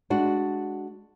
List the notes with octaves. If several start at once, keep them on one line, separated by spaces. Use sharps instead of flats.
G#3 D4 F#4